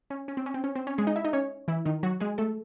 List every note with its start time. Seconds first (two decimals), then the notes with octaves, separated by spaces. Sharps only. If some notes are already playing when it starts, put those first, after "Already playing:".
0.10 C#4
0.28 C#4
0.37 C4
0.46 C#4
0.54 C4
0.64 C#4
0.75 C4
0.87 C#4
0.98 G#3 G#4
1.07 D#4 D#5
1.16 E4 E5
1.25 D#4 D#5
1.33 C#4 C#5
1.68 E3 E4
1.85 D#3 D#4
2.03 F#3 F#4
2.20 G#3 G#4
2.38 A3 A4